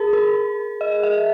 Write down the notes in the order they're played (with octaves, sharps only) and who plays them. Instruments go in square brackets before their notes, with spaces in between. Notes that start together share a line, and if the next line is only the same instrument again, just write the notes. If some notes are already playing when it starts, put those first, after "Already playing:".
Already playing: [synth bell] G#4 A#4
A#4
D#5
E5